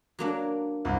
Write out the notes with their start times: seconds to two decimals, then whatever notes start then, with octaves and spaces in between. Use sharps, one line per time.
0.19 F#3 A#3 D4
0.85 C2